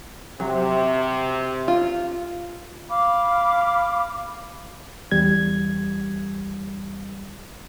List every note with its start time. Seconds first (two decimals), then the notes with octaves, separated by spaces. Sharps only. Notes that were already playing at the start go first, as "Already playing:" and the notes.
0.40 C3 F#3
1.68 F4
2.90 F5 B5 D6
5.12 E2 G3 G#6